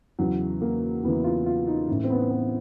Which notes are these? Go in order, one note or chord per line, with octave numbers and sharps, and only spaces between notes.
E2 C#3 E3 F#3
A#3
E2 C#3 E3 B3
F4
F4
D#4
A2 E3 C#4
C4
B3
B3